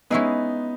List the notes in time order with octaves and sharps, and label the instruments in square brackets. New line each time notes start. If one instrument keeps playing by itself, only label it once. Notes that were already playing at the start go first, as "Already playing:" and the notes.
[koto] G#3 C#4 E4 G#4 [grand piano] B3 D#4